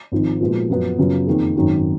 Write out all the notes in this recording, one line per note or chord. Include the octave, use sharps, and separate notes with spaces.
G#1 G#2 F3
A#2 F3 G#3 B3 F#4
F#2 F3 B3 F#4
F#2 C#3 F#3 B3 F4
F2 D#3 A#3 D#4 G#4
G#1 F#2 D#3 F#3 C#4